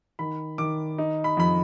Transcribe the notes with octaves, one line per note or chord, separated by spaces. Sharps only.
D#3 B5
D#3 D6
D#4
B5
F2 B5